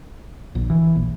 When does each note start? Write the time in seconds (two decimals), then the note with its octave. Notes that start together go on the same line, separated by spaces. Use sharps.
0.55 A#1
0.70 E3
0.95 A#1